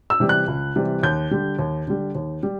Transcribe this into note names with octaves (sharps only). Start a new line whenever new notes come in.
E6
C3 E3 G3
F#6
C#2
C3 E3 G3
D#2 G6
D3 G3
D#2
D3 G3
D#2
G3